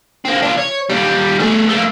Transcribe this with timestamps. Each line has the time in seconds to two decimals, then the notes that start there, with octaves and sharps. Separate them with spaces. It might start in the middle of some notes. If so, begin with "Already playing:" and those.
0.25 A#3 C4
0.42 D4 F4
0.57 C#5
0.90 D#2 G3
1.39 A3 G#4
1.69 A3 A#3